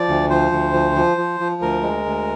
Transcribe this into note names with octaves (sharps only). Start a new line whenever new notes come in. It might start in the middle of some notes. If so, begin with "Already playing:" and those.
Already playing: F3 D5
D2
F3 C5
D2
F3
F3
F3
F3
D2 A#4
G#3
D2